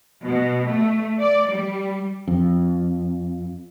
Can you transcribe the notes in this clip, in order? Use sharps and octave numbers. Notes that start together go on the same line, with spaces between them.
B2
A3
D5
G3
F2